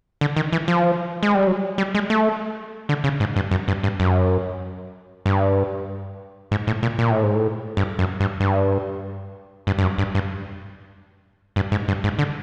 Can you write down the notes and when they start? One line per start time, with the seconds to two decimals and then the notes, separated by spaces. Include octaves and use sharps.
0.21 D3
0.37 D#3
0.53 E3
0.68 F3
1.23 G#3
1.35 G3
1.47 F#3
1.78 G3
1.95 G#3
2.10 A3
2.89 D3
3.04 C#3
3.20 G#2
3.36 G2
3.51 F#2
3.68 G2
3.83 G2
4.00 F#2
5.26 G2
6.51 G#2
6.67 A2
6.83 A#2
6.99 A#2
7.11 A2
7.23 G#2
7.35 A2
7.77 G2
7.99 F#2
8.20 G2
8.40 G2
9.67 G2
9.78 G2
9.82 F#2
9.98 G2
10.15 G2
11.56 G2
11.72 G#2
11.88 G2
12.04 G#2
12.19 D3